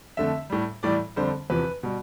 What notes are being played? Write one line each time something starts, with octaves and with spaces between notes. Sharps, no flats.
F2 D3 A3 E5
A2 G3
A2 E3 G3 D5
F2 D3 G3 C5
E2 C3 F3 B4
B2 G3